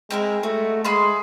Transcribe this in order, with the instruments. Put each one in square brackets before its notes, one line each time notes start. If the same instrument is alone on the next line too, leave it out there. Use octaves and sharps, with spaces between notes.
[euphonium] G#3 [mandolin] C4 E4 A#4
[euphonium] A3 [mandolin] F#4
[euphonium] G#3 [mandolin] G#4 B5 C6